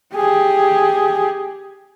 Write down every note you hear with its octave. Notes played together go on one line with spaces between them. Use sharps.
G4 G#4